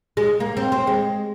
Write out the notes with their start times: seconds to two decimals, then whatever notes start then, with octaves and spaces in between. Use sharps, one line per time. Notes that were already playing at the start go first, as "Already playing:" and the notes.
0.17 G#3
0.40 A#3
0.57 C4
0.72 C4
0.87 G#3